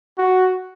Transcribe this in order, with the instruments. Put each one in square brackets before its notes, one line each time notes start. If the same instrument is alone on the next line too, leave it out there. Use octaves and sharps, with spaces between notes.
[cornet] F#4